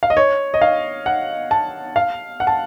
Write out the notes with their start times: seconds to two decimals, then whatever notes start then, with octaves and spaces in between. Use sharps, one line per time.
0.03 F5
0.10 D#5
0.17 C#5
0.54 D#5
0.62 F5
1.06 F#5
1.51 A5
1.96 F5
2.40 F#5
2.47 A5